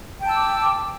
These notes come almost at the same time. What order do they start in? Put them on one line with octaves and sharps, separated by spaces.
G5 A5 E6 D6